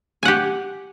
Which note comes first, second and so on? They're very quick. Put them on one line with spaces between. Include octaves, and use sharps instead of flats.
G#5 F#5 G4